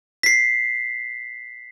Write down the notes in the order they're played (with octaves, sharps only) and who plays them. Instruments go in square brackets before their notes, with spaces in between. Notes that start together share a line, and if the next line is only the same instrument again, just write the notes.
[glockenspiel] B6 C7